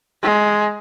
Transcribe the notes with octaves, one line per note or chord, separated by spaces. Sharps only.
G#3